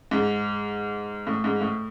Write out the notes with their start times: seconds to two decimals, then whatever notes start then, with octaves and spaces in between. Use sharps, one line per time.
0.11 G#2
1.27 A2
1.44 G#2
1.61 A2